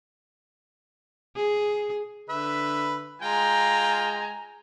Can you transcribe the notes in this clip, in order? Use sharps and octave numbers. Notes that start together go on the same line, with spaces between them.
G#4
D3 B4 E5
G#3 F4 G5 G#5 A#5